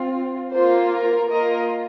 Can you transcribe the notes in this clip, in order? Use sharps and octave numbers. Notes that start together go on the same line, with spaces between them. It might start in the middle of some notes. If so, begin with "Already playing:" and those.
Already playing: C4 F4
A#3 F4 C5
A#4
A#3 F4 A#4 D#5